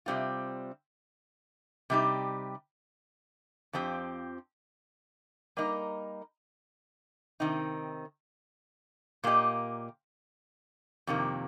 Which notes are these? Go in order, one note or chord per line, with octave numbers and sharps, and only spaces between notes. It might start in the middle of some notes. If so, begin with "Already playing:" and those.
C3 D#3 G3 C4 F4
C3 G3 D#4 G4
F2 F3 C4 G4
G3 A#3 D#4 A#4 D#5
C3 D#3 C4 D#4
A#2 A#3 G4 D#5
F2 C3 D#3 A#3